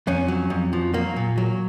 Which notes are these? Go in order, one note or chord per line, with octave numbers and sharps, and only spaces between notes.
F2 C#4
F#3
F2
F3
F#3 A#3
A#2
F#3